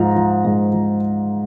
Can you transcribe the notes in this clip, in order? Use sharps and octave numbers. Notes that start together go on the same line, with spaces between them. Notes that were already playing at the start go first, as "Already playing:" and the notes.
Already playing: G#2 F3 A#5
F3
G#2
F3